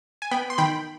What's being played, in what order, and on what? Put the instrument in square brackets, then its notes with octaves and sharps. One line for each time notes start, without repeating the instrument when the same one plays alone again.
[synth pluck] G#5
B3 G5 B5
C6
D#3 G5 B5